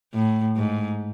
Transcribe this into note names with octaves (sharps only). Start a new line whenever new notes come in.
A2
G#2